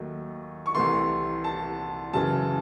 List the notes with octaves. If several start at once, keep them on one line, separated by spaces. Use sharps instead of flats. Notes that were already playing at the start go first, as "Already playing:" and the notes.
Already playing: D#2 D#3 F#3 A3
C#6
C2 C3 E3 A3 C6
A5
F#2 C#3 E3 A5